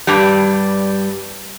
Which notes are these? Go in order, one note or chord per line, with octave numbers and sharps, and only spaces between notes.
G2 G3